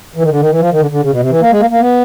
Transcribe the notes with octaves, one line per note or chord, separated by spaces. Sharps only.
E3
D#3
D3
D#3
E3
F3
D#3
D3
D3
C#3
B2
C3
E3
A#3
G#3
A#3
A#3
B3